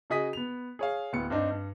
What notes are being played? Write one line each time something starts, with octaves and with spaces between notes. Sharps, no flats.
C#3 F#4 G#4 D#5 D#6 B6
B3 F7
G#4 C#5 F5
D1 B3 C#7
G2 C4 D4 D#4
G2